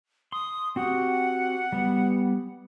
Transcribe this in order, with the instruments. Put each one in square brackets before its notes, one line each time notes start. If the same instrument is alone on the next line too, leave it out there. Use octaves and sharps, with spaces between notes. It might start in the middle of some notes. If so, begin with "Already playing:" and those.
[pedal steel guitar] C6 [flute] D#6
[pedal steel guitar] C4 F#4 G4 [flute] F#5
[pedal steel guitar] G3 B3